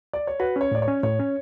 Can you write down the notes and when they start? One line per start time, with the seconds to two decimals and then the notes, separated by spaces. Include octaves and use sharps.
0.13 D5
0.27 C#5
0.40 F#4 B4
0.56 C#4 C#5
0.71 A2 D5
0.82 C#5
0.88 C#4
1.03 A2 C#5
1.19 C#4